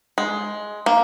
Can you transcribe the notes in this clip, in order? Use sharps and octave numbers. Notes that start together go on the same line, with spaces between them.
G#3
A#3